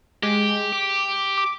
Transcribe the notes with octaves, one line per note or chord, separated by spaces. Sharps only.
G#3 G4
D6
D6